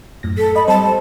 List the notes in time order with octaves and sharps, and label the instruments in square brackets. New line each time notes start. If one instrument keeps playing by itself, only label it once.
[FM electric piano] F#2 A2 A#6
[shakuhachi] A4 [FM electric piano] B6
[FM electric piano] D#5 [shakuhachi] B5
[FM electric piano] G3 C4 C5 [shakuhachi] A5